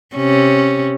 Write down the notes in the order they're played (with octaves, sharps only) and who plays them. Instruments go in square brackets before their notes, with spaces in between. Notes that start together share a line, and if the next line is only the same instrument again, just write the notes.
[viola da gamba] C3 C#4